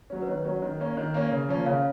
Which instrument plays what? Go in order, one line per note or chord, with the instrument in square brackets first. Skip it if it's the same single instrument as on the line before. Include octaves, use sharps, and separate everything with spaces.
[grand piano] F#3 C#4
[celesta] B4
[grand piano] D#3 [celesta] C#5
[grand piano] F#3 C#4
D#3
A#3 C#4
D#3
A#3 C#4
C#3
F3 A#3 C#4
[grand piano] C#3 [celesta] C#5 F5